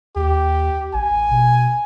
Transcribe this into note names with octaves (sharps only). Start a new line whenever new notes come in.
D#2 G4
A1 G#5
B2